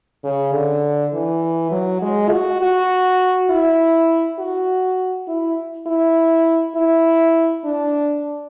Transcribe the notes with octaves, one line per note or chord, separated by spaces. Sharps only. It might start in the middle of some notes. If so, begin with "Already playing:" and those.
C#3
D3
E3
F#3
G#3
F#4
F#4
E4
F#4
E4
E4
E4
D4